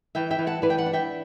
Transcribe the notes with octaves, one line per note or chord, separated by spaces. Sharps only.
E3 E5 G5
E5 G5
E3
F#5 A5
E3 B4 D5
G5
D5 F#5
D4
E5 G5